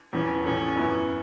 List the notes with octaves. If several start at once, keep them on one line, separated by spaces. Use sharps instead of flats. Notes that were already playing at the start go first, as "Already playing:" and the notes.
E1 E2 E3 C#4
A1 A2 A3 C#4
F#2 E3 B3 E4